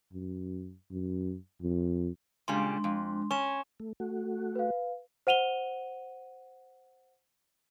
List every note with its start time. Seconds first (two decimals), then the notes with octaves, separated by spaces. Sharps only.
0.13 F#2
0.91 F#2
1.62 F2
2.48 A#2 C#3 G3 G#3 D4 C6
2.84 F2
3.31 C#4 C#6 E7
3.80 A3
4.00 A3 F#4
4.56 B4 F5
5.27 C5 F#5 D#7 F7 G7